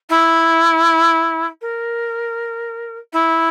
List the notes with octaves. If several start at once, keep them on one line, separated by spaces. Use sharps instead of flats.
E4
A#4
E4